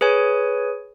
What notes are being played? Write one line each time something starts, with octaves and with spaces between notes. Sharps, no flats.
G#4 B4 C#5 G#5